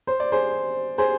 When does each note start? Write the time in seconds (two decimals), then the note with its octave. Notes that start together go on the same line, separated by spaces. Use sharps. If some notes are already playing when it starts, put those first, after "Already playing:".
0.07 C5
0.20 D5
0.32 G#4 C5
0.98 G#4 C5